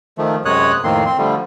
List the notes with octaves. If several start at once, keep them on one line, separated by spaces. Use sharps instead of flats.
D#3 F3 A3
F#2 C3 G#3 C#5 D#6 F#6
F2 A2 D#3 A#3 C4 C6
C4 C6
D3 F3 G3 A3